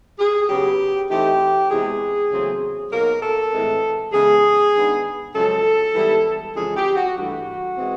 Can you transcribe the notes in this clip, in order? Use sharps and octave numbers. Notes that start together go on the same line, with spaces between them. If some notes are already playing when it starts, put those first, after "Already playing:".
G#4
C#3 F#3 B3 G4
E3 A3 C4 D#4 G4
E2 C3 E3 G#3 G#4
E2 C#3 F#3 A3 C4
B2 F#3 A#3 D#4 A#4
A4
A2 E3 G#3 C4
C#3 E3 G#3 B3 G#4
D#3 G#3 B3 D4
F#2 C#3 F3 G#3 A4
G#2 E3 G3 B3 E4
F2 C#3 E3 G#3 C#4 G#4
G4
F#4
G2 E3 A3 F#4
E3 G#3 C4